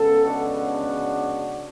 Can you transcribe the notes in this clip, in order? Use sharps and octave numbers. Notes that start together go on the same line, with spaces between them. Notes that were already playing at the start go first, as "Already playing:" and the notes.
Already playing: C#3 G#3 B3 A4
D4 F#4